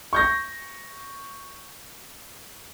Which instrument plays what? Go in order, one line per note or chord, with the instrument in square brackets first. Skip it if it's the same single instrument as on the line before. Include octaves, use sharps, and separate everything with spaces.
[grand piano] C#6 G6 A#6